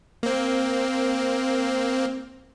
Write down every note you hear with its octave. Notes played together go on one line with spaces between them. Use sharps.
A#3 C4